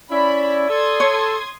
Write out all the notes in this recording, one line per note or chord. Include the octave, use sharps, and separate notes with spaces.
C#4 E4 D5 B5
A4 C6 D#6 G#6
C#5